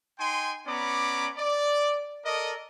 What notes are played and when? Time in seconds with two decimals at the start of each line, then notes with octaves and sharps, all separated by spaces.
0.19 D#4 G5 G#5 C6
0.67 B3 C#4 D5 A#5 B5 D6
1.38 D5
2.24 A4 A#4 D5 D#5